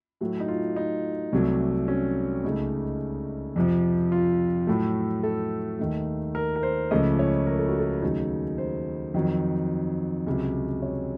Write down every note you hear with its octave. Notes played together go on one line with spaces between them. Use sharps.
A2 F#3 A3 F#4
D#4
F4
D#4
C2 C3 F#3 A3
C#4
C#2 C#3 A3 D#4
F2 C3 F3
F4
A2 F#3 A3
A4
D#2 D#3 A3
A#4
A#4
C5
C#2 C#3 F3 A3 D#5
C#5
A#4
A4
F#4
A4
D#2 C#3 F#3 A3 D#4
C5
F2 D#3 F#3
C#2 C3 F#3
C#5